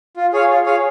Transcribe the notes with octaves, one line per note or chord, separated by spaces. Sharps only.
F4
G#4 C#5 F5
F4
G#4 C#5 F5